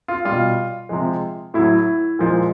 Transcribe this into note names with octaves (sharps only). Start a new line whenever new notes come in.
F4
B2 G3 F4
C3 F3 G#3
A2 F#3 E4
A#2 F3 G#3